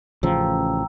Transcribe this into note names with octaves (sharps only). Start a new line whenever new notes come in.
A1 C#3 F3 G5 A#5 E6